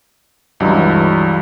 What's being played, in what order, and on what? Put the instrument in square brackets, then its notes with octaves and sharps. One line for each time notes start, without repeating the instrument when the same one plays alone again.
[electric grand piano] C#2 G2 E3 F#3